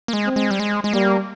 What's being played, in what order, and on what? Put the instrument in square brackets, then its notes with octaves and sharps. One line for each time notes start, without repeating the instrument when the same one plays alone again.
[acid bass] A#3
G#3
[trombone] C4
[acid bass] G#3
G3
G#3
G#3
[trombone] G3 [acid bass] A#3